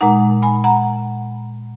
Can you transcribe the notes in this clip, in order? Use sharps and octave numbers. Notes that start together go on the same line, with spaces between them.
A#2 G#3 D#4 F#5 A#5
G#5 B5
F#5 A#5